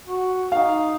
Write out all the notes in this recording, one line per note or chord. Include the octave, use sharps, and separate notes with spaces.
F#4
D#4 F5